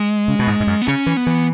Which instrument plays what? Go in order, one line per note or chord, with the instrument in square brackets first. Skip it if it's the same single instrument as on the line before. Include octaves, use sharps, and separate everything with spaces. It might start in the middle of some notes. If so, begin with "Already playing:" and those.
Already playing: [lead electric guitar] G#3
[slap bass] C#3
B2
G#2
G#2
F#2
[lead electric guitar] B3
[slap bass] C#3 [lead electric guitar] C#4
[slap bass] E3
[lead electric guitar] B3
[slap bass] E3